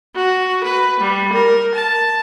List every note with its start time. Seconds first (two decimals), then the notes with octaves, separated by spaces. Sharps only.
0.15 F#4
0.64 B4
1.00 G3
1.33 A#4
1.75 A5